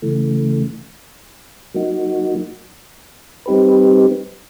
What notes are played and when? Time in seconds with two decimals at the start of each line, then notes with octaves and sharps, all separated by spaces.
0.02 C#3 E3 A3
1.74 F#3 A#3 D#4 F#4
3.46 G3 C4 D#4 G4 B4